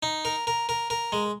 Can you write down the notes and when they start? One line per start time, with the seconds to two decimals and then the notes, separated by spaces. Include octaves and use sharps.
0.03 D#4
0.25 A#4
0.47 A#4
0.69 A#4
0.90 A#4
1.12 G#3